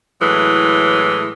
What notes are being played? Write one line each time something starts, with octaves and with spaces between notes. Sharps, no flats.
A2 E3 F#3 G#3